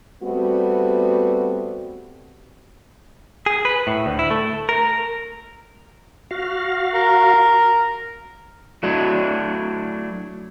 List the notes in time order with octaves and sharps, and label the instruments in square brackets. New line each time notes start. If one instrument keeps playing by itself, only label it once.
[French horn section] G3 A3 B3 C4 F#4
[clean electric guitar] G#4
B4
A2
D2
E4
A3
A#4
[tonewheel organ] F#4 F5
[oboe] A#4
[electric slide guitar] F#3 A3 D4 E4 F#4